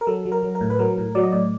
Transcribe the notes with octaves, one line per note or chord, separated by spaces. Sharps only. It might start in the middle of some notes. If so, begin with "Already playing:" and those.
A#4
F#3 A4
F#3
A#4
F#3
A#4
A2
B4
F#3 A#4
A2
F#3 D5
D#5
A2 D5